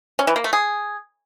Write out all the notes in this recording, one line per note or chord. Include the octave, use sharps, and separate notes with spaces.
C#4
E3
A#3
A3
G#4